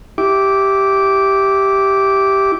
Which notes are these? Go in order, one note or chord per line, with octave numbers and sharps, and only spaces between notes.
E4 G4 D6